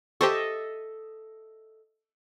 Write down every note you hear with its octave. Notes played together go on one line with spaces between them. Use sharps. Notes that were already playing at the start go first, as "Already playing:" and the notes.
G4 A4 C5 D#5 E5 C#6